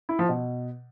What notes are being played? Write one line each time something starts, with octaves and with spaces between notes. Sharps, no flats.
E4
F3
B2